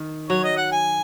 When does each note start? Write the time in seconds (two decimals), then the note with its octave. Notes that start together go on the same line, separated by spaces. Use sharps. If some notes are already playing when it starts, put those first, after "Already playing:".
Already playing: D#3
0.29 F#3 C#5
0.43 D#5
0.57 F#5
0.72 G#5